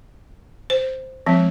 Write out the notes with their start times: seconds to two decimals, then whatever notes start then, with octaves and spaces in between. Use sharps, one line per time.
0.70 C5
1.26 F3 G#3 C4